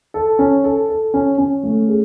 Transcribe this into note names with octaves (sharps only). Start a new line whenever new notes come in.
A4
C#4
A4
A4
C#4
C#4
A3
G#4